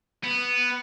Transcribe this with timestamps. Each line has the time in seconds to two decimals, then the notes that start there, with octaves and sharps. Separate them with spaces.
0.24 B3